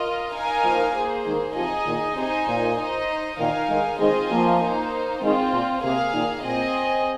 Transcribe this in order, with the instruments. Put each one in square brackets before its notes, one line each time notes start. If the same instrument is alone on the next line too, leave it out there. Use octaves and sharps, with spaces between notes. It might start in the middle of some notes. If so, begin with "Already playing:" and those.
Already playing: [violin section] F4 A#4 D#5
D#4 A#4 F5 G#5
[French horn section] F3 A#3
[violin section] A#3 G#4 C5
[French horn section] D#3 G#3
[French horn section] C3 F3 [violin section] D#4 G#4 D#5 G#5
[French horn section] A#2 D#3
[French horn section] C3 [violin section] D#4 C5 D#5 G#5
[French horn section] A#2
[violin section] D#4 C5 D#5
[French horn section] A#2 D#3 [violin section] D#4 A#4 F5 G#5
[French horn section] D#3 G#3
[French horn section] D#3 G#3 [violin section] C4 F4 C5 D#5 G#5
[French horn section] F3 A#3
[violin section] A#3 D#4 C5
[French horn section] D#3 G#3 [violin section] C4 F4 C5
[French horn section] A#2
[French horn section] C3 [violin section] A#3 G#4 F5
[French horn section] A#2 D#3
[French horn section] A#2 [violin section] C4 G#4 D#5 G#5